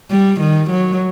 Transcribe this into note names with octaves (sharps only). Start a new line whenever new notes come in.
G3
D#3
F#3